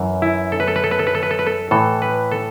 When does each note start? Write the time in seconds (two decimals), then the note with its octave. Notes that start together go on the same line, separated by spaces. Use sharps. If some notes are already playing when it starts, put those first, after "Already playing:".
Already playing: F#2 E3
0.22 E4
0.52 A4
0.60 B4
0.68 A4
0.76 B4
0.84 A4
0.91 B4
0.99 A4
1.07 B4
1.15 A4
1.23 B4
1.31 A4
1.39 B4
1.47 A4
1.71 A2 E3 A4
2.02 B4
2.32 A4